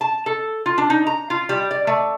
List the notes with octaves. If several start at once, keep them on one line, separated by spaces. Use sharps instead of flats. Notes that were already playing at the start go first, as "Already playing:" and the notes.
A5
A4
F4
D4
D#4
A#5
F4
G3
D5
A3